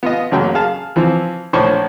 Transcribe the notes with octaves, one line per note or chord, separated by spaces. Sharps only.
B3 F4 D#5
A1 F#2 C#3 F#3 A#3 G5
G#4 F5 A5
E3 F3 C4
A#1 A2 C#4 C5 B5 C#6